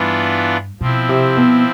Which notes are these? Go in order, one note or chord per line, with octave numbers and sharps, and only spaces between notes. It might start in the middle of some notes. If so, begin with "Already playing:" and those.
Already playing: G2 E3 B3 D4 F4
B2 F3 C4 E4
C3
B2